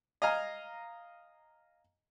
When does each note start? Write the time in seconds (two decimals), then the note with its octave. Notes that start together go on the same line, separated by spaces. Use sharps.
0.22 D#5 F5 G#5 A#5 F6